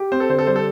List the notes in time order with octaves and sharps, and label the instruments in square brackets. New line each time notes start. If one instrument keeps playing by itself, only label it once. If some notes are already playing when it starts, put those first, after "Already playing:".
Already playing: [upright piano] G4
[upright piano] C4 [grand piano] C5
[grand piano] A4
[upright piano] D3 [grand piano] C5
[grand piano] A4
[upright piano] G3 [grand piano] C5
[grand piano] A4